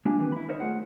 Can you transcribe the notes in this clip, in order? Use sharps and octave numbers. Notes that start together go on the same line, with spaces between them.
G#3 A#3 D4 F4 G4 G#5
D#3 E3 C4 B4
E4 B5
D#4 A#4 C5 C#5 D#5 E5
A3 F4 G#4 F#5